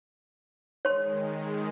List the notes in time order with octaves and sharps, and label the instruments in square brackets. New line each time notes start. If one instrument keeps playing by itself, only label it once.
[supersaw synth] D#3 G#3 [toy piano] C#5 C6